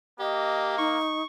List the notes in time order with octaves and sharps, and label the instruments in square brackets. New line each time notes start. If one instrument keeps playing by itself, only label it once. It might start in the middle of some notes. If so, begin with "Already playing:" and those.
[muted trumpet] A#3 [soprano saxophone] G4 [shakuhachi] D#5
[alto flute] D#4 [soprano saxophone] C#6